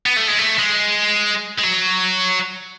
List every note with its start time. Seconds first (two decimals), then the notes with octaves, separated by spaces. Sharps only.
0.06 B3
0.16 A3
0.28 G#3
0.38 A3
0.59 G#3
1.59 G#3
1.64 F#3